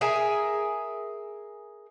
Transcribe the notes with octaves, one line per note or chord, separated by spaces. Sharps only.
G#4 A#4 E5 G#5